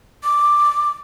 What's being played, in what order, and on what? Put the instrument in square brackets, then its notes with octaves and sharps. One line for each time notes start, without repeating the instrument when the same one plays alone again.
[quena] D6